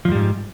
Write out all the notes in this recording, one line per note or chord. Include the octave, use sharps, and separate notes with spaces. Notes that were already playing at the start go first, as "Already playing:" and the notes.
F2 G#2 F3 G3